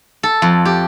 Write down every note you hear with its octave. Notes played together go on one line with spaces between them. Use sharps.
A4
F2
G4